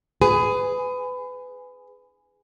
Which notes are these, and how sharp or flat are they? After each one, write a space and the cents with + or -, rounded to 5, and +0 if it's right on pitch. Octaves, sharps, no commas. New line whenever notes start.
G#4 +0 B4 +25